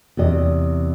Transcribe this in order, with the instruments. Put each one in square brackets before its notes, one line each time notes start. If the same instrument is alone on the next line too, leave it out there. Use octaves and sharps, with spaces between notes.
[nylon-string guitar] E2 C3 D#5